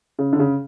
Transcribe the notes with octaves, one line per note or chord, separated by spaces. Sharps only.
C#3
D3
C#3